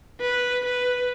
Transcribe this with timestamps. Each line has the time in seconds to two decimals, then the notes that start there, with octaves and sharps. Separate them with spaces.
0.21 B4
0.65 B4